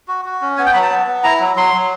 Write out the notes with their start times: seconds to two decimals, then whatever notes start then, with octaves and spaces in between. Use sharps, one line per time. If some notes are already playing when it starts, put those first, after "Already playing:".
0.08 F#4
0.25 F#4
0.41 C#4
0.57 B3 G#5
0.66 G5
0.74 F#3 B5
0.82 A5
0.91 B3
1.07 B3
1.24 E4 A#5
1.40 F#3
1.56 F#3 C6
1.74 F#3